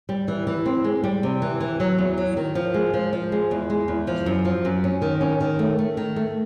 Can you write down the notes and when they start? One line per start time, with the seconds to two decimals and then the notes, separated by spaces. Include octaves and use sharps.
0.09 G3
0.28 E3
0.47 E3
0.66 C4
0.84 G#3
1.04 G3
1.23 C3
1.42 E3
1.61 E3
1.80 F#3
1.98 E2
2.18 F#3
2.37 D#3
2.55 F3
2.74 G#3
2.94 F3
3.13 F3
3.32 G#3
3.51 E2
3.70 G#3
3.88 E2
4.07 F3
4.26 F#2
4.45 F3
4.65 F#2
4.84 C#4
5.02 D#3
5.21 C#4
5.41 D#3
5.59 A3
5.79 A3
5.97 D#3
6.16 A3